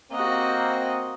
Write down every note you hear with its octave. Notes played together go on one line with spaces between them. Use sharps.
A#3 C4 F#4 D#5